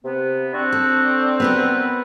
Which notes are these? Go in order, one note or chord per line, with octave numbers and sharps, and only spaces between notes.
C3 B3
C4 D4 F#4
A4
B3 F#4 A#4 B4